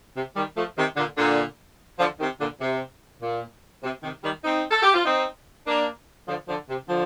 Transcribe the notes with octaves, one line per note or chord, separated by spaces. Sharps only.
C3
D#3 G3
F3 A3
C3 D#3
A#2 D3
A#2 D3
D3 F3
C3 D#3
A#2 D3
C3
A#2
C3
C3 D#3
D#3 G3
C4 D#4
A4
G4
F4
C4 D#4
A#3 D4
D3 F3
D3 F3
C3
D3 F3